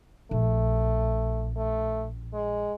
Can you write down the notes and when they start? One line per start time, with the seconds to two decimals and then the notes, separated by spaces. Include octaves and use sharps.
0.31 A#1 A3
1.56 A3
2.33 G#3